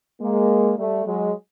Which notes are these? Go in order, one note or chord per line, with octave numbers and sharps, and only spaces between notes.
G#3 A#3
G3 A3
F#3 G#3